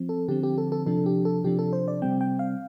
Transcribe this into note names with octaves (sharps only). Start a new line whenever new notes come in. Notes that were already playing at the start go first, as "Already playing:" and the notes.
Already playing: F3 C4
A4
D3 F3 C4 G4
G4
A4
A4
C3 F3 D4 A4
G4
A4
C3 F3 D4 G4
A4
C5
D5
C3 G3 C4 G5
G5
F5